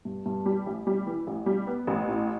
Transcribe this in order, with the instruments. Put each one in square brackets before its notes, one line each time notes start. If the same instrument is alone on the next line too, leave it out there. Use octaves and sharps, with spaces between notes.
[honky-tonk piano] G2
G2
G3
A1
G3
E3
A1
G3
B3
A1
A2